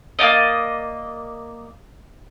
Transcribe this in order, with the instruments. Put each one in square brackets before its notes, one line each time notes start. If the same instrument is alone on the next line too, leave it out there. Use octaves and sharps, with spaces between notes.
[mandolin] A#3 D#4 D5 D#5